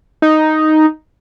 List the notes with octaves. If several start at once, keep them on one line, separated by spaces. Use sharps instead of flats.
D#4